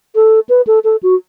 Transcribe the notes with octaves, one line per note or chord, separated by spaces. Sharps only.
A4
B4
A4
A4
F#4